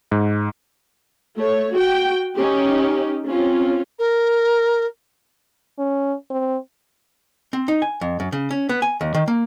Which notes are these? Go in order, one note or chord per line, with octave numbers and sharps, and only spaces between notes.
G#2
A3 C#5
F#4 G5
C#4 D#4 G4
C4 C#4 F4
A#4
C#4
C4
C4
D#4
G#5
F2
F#2
C#3
C#4
B3
G#5
D#2
D#3
A#3